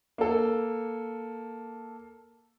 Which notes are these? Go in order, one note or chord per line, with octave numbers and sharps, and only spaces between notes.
A#3 A4